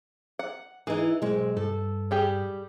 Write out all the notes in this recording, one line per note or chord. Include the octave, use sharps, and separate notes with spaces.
F#5
E3 D#4 G#4
B1 G#3 C4
G2 A4
G3 G4 G#4